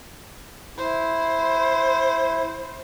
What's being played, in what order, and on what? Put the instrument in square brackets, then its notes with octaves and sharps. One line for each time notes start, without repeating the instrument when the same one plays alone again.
[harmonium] E4 [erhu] C5